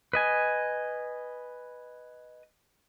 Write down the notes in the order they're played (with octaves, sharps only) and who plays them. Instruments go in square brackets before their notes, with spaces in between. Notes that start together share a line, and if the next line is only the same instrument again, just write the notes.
[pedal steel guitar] B4 D#5 G#5